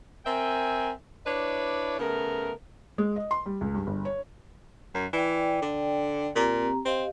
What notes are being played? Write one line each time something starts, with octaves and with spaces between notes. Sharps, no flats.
C4 A#4 E5 G5 G#5
D4 E4 B4 C#5 D5
C#3 A3 B3 A#4
G#3
D#5
C6
G3
C#2
G2
G1
C#5
F#2
E3 D5 G5
D3
A#2 C4 G4 A#5
C4 G4 D#5 F5